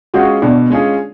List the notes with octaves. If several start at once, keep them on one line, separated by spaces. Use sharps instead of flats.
G#3 C#4 F4 F#4 G#4
B2 D4
G#3 C#4 F4 G#4